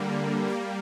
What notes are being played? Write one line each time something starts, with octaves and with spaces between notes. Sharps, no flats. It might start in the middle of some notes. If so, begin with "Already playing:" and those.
Already playing: D3 G3 A#3
G3 A#3